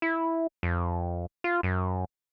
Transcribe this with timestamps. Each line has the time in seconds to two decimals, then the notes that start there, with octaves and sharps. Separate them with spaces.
0.02 E4
0.63 F2
1.44 F4
1.63 F#2